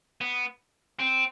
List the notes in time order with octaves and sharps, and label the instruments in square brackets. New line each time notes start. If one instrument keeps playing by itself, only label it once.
[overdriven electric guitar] B3
C4